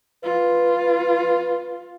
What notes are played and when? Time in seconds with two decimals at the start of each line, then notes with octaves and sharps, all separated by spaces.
0.24 F4 B4